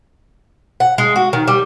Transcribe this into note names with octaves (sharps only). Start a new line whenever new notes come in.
F#5
G#3
F#4
D#3
G3